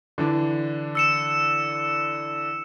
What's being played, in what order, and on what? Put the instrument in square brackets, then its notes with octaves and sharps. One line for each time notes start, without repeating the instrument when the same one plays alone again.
[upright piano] D3 E3 D4
[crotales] E6 C#7 E7